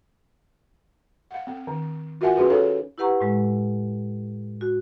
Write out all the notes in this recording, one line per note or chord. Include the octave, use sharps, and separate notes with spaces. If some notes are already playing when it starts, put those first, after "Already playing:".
F5 F#5
C4
D#3
F4 F#4 A#4 E5 F#5 G#5
C#4 E4 F#4 G#4 B4
D#4 A4 C#5 F5
E4 G4 B4 F#5 A#5 C#6
A2 G#3
F#4